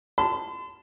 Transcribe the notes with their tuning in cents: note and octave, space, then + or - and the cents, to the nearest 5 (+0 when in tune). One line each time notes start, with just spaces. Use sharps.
A5 +0 C6 -40